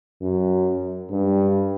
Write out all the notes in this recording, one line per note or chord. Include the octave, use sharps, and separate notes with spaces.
F#2
G2